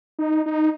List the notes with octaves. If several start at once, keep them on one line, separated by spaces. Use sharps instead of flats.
D#4
D#4